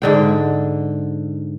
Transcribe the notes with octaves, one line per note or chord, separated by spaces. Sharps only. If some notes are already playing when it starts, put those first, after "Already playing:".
G#2 D3 G5